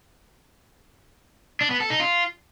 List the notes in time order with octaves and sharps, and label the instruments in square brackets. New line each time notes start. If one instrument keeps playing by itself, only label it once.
[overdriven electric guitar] D4
B3
A4
D#4
F4